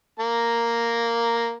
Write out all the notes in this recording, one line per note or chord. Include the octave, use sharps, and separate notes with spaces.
A#3 A#5